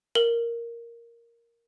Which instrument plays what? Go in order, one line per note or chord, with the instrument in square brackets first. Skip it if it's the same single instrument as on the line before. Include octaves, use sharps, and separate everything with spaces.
[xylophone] A#4 F#7 G7